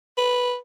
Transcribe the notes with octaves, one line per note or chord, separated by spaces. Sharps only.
B4